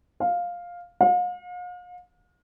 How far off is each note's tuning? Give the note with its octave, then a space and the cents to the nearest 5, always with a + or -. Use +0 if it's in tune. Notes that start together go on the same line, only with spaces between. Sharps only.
F5 +10
F5 +45